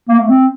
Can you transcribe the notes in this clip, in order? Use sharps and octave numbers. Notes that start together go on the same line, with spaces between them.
A#3
A3
C4